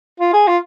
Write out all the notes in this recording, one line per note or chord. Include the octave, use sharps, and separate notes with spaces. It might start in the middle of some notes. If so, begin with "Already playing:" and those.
F4
G#4
F4